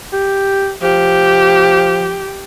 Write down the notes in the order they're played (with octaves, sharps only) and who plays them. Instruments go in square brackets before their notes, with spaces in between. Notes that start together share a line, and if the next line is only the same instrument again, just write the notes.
[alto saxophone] G4
[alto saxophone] F3 [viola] G4